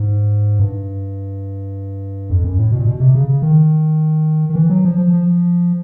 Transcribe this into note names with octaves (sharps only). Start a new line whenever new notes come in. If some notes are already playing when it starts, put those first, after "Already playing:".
Already playing: G#2
G2
F2
F#2
A2
B2
A#2
B2
C3
C#3
C#3
D#3
D#3
E3
F#3
F3
F3
F3